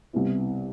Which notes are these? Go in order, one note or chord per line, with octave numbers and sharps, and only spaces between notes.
C2 B2 G3 B3 E4